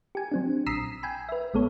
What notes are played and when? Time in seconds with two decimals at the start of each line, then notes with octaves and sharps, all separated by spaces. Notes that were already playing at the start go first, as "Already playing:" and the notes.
0.15 G4 G#5
0.32 F#3 C4 D4
0.66 A#1 A#5 D#6 E6 B6 C7
1.03 G5 G#5 B5
1.29 B4 E5
1.54 A#1 G#3 B3 A4 C#5